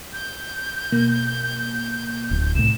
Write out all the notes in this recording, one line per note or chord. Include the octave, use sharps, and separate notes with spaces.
G6
B2 A#3
D1
C2 A2 E7